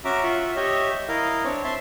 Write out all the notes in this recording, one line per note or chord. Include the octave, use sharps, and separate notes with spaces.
C#4 F#4 E5 A#5 D6
F4 E5 F#5
G4 C#5 D#5 E5
E4 A#4 D#5 F5
C4 D4 C#5
E5 A5 C6